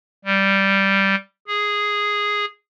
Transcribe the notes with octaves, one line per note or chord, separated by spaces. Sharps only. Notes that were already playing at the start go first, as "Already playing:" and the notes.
G3
G#4